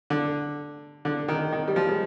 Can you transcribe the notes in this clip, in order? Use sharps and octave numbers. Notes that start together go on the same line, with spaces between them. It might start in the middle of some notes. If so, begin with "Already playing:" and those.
D3
D3
D#3
D#3
G3
F3
G#3